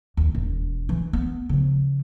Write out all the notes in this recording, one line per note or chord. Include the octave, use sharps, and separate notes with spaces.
D#2
E1
E3
B3
C#3 F3